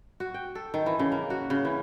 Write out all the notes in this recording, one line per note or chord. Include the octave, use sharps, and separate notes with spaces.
F#4
G5
A4
D#3
E3
C#3
A#3
F#4
C#3
E3